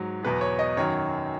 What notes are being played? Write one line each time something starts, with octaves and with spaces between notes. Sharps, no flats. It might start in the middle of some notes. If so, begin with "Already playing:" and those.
Already playing: G#2 F#3
E2 B2 F#3 B4
C#5
D#5
F#2 D#3 F#3 C#5